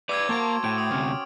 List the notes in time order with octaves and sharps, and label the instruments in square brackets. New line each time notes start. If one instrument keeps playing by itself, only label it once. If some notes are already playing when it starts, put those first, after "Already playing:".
[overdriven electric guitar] B4 D5 [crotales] D6 E6 G#6
[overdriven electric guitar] A#3 A#4 [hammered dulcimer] F#4 C5 A5 [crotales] C#6 D7
[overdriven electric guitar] A2 [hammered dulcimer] G5 [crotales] D7
[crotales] D#6
[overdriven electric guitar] D2 C3 [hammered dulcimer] C#4